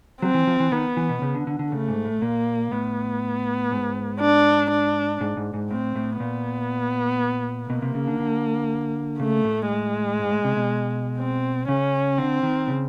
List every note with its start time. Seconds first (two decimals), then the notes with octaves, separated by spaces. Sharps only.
0.22 F#3 C4
0.34 E3
0.47 F3
0.60 E3
0.72 D#3 B3
0.97 E3
1.09 B2
1.22 C#3
1.35 D3
1.47 D3
1.59 D3
1.72 C#3 A3
1.88 G#2
2.05 A2
2.22 A#2 A#3
2.71 A2 B3
3.72 G#2
4.21 D4
4.71 D4
5.21 G#2
5.37 G#2
5.54 G#2
5.70 A2 C4
5.95 A2
6.20 A#2 B3
7.70 B2 A#3
7.82 C3
7.95 C#3
8.07 D3
8.19 D3
9.19 C#3 A3
9.45 A2
9.69 G#3
10.19 G#2
10.31 A2
10.44 C3
10.57 B2
11.19 C4
11.68 C#3 C#4
12.18 D3 C4
12.43 D#3
12.68 C#3